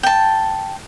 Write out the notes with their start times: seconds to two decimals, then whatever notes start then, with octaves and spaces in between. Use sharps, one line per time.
0.03 G5 A5